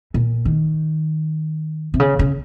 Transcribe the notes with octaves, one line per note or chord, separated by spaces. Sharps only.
A#2
D#3
C3
C#3
C#3